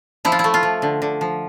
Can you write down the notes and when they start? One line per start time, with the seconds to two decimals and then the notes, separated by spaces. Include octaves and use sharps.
0.25 F3 E4
0.32 F4
0.39 E4
0.44 A3
0.54 F4
0.63 F3
0.82 D3
1.02 D3
1.21 F3